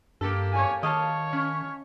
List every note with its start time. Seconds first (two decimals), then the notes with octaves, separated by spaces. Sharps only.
0.21 G2 A#3 G4 A4
0.52 C#5 G#5
0.83 D#3 C#5 D#5 F5 A5
1.33 C#4